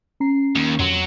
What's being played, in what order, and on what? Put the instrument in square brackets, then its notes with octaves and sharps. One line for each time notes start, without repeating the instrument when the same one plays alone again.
[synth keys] C#4 A#5 C7
[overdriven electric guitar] D#2
[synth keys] F2 C6 [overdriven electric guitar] F#3